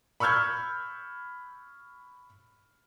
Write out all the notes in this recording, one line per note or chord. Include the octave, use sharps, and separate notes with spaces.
B5 C#6 E6 F6 G6 G#6